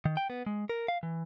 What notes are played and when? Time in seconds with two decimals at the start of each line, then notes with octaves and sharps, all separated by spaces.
0.05 D#3
0.17 G5
0.30 B3
0.46 G#3
0.69 A#4
0.88 F5
1.03 E3